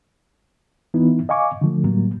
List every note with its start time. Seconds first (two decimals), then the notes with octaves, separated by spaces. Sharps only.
0.94 E3 B3 D#4 E4
1.29 D#5 F5 G#5 C#6 D6
1.61 D3 F3 A3
1.83 A2 F#3 G3 A#3